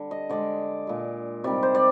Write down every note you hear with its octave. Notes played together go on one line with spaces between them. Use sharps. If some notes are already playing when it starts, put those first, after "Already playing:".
Already playing: D3 G3
D#5
D3 G#3 D5
A#2 G#3
C3 D#3 G3 D5
C5
D5